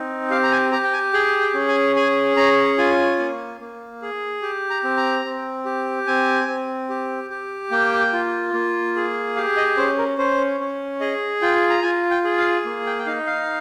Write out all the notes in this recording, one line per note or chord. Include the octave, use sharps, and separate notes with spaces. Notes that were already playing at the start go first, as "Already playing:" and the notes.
Already playing: C4 D#4
G4 F5
A#5
G#5
G4 A#5
G5
G#5
G#4 G5
G5
C#4
G#5
G#4 G#5
C#4 A#5
F4 G#5
A#3
A#3
G#4
G4
A#5
C4
A#5
C4
G4
C4 G#5
C4
G4
G4
A#3 G5
F4
A#3
G#4
G4 F5
D#5
C#4 C5
A#4
C#4 C5
C#4
G#4 D#5
F4 G5
A#5
F4 G#5
G5
G#4
F5
A#3
G5
G5
D#4 F5
F5